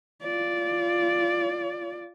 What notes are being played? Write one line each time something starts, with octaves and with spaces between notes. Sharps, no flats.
F4 D5